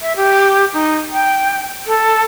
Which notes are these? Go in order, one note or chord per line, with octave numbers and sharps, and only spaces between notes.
E5
G4
D#4
G5
A4